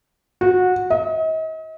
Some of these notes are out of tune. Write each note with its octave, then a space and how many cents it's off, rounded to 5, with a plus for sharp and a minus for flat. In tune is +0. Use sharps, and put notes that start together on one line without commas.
F#4 -20
D#5 +40